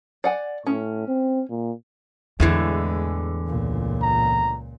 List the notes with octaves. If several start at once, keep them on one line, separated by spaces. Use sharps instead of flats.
D5 F#5 G#5
A2 C#4
C4
A#2
E2 A2 D3 E3 G#3
C#2 A#2
A#5